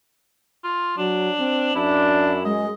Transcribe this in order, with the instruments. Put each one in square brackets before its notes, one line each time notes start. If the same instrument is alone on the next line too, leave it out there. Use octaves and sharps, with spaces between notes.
[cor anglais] F4
[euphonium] F#3 [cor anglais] D4
[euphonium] C4
[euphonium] F#2 [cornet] D4 [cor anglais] E4
[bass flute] G#3 [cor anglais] D#5